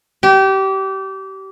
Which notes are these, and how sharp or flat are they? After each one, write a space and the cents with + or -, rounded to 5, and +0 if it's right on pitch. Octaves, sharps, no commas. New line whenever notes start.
G4 -25